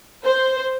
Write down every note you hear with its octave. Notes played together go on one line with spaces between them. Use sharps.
C5